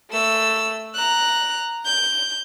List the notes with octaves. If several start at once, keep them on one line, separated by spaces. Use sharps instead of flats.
A3 E6
A#5 F#6
G6